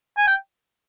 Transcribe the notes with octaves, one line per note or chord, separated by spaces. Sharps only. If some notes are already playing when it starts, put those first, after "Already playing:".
G#5
G5